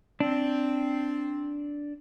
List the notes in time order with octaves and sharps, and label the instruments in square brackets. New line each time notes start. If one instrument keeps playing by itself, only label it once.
[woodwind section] C4 [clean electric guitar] D4